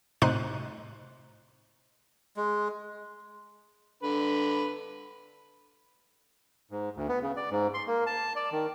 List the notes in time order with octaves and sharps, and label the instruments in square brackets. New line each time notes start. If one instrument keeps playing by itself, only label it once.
[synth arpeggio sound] A2 C3 D#4 C5 F#6 D#7
[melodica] G#3
[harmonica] D3 B4
[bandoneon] G#2
D2
B3
C#3
D5
G#2
C6
A#3
A5
D5
D#3